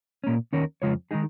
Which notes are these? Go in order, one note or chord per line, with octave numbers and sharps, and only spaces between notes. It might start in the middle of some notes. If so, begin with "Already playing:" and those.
A#2 A#3 C#4
D#2 D#3 C#4 A#4 C#5
F2 C#3 G#3 F4 C#5
D#3 G#3 D#4 G#4